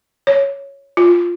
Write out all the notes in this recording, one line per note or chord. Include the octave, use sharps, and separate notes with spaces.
C#5
F4